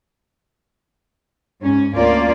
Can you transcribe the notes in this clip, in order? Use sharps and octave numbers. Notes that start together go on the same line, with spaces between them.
G#2 C#4
D2 A#3 C#4 F4 D5